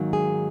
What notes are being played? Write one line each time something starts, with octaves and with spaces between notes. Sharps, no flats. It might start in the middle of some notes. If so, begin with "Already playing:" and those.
Already playing: G#2 D#3 F#3 A#3
G#4